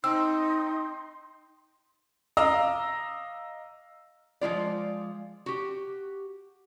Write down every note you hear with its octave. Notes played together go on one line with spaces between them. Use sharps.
C4 D#4 C6 E6
D#5 F5 A#5 D6 E6
F3 G#3 F4 D5
F#4 G4